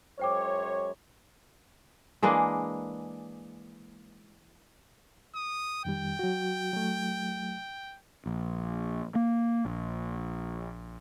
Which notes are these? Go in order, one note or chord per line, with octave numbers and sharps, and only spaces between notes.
F#2 G#3 C5 C#5 G5 D6
E3 G#3 A#3 D4
D#6
F2 D#3 G3 G5
F#3 F#4
F#3 A3
A#1
A#3
A#1